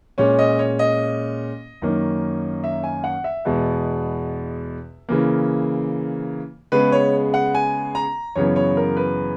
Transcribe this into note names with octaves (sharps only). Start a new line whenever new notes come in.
A#2 G#3 C#4 C#5
D#5
C#5
D#5
F#2 D#3 A#3 C#4
E5
G#5
F#5
E5
E2 B2 G#3 B3
C#3 E3 A#3
C#3 G#3 B3 B4
C#5
F#5
G#5
A#5
F#2 C#3 E3 B3 C#5
C#5
A#4
B4